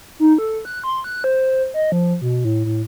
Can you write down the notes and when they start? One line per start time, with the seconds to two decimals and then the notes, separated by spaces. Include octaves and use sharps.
0.20 D#4
0.38 A4
0.65 F#6
0.84 C6
1.04 F#6
1.24 C5
1.74 D#5
1.92 F3
2.21 B2
2.44 A2
2.65 A2